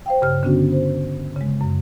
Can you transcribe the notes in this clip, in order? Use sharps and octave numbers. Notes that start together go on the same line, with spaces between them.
C5 F5 G5
G2 C#3 G4 F6
D3 B3 C#4 D4 F#4
C5
C#3 G#3
F#2